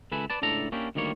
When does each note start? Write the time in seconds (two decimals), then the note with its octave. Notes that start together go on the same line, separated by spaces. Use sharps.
0.12 C#2 A4 B4 E5 G#5 B5
0.30 B4 D5 A5
0.42 C#2 A2 D4 A4 A#5
0.72 A#3 C#4 D4 E4 G4
0.95 D2 D#3 G3 A#3 C#5